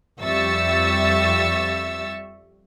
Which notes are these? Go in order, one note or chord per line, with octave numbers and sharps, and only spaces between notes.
F2 G3 E5 C#6 E6 A6